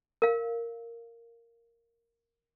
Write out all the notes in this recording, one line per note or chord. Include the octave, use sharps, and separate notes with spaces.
A#4 F5